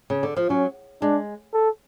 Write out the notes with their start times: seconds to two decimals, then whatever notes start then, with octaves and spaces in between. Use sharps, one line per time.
0.10 C#3
0.23 D3
0.37 F3
0.50 F#3 C#4
1.02 G#3 D4
1.54 A4